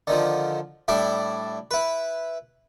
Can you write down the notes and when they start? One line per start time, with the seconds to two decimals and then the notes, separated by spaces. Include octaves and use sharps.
0.07 D3 D#3 F3
0.88 A2 G3 D4 E4 D5
1.71 E4 B4